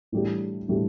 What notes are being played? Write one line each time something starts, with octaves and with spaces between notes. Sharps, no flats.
A2 E3 G3 D4 G4
A2 E3 G3 D4 G4